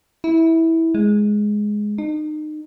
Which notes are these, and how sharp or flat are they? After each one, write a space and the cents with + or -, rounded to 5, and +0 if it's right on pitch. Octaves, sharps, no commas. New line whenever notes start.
E4 -15
G#3 +5
D#4 -30